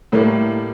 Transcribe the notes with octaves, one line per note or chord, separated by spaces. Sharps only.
A2 G3 A3 A#3